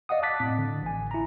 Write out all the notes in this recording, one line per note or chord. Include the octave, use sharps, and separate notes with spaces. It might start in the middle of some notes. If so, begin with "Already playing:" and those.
D5 D#5 F5 F#5 D#6
A5 D6 F#6 A6 B6
A2 C4
D3
A1 G#5
E4 A#5